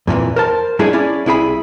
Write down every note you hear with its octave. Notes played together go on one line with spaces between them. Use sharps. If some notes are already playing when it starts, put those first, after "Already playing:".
F2 A#2 D#3 E3
A#4 C5 A5
F#3 G#3 A3 D4 E4 G#4
C#4 E4 D5
C2 E4 G#4 B5